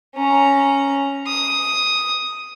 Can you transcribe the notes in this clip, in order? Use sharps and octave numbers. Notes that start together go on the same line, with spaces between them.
C#4 A#5
D#6